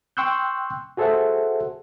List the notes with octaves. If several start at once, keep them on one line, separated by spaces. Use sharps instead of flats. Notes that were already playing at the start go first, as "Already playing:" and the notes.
G5 C6 C#6 E6 F#6 G6
F#4 G#4 A4 C5 E5 F#5